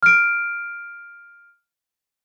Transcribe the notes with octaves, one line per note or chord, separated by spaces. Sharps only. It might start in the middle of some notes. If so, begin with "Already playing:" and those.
F6 D7